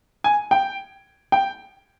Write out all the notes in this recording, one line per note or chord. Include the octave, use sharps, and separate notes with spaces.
G#5
G5
G5